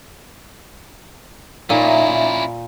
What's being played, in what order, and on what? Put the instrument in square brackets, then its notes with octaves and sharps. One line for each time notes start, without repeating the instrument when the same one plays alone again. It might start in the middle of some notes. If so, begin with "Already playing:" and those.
[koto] A#2 [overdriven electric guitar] C#4 E4 [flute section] D#4 E5